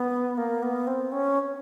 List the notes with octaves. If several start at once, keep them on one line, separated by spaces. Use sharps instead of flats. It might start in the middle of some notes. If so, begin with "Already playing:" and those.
Already playing: B3
A#3
B3
C4
C#4